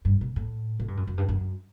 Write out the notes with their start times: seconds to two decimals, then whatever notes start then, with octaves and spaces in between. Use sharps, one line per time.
0.05 G2
0.21 B2
0.36 A2
0.80 A2
0.88 G2
0.97 F#2
1.07 F#2
1.18 G2
1.29 F#2